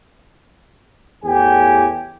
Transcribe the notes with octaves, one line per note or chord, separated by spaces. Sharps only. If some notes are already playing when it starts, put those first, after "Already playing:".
E2 A2 G4 G#5